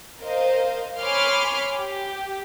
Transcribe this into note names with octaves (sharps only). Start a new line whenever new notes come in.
A#4 C5 D#5 F5
C#5 G#5 B5 C6 D6 F6
G4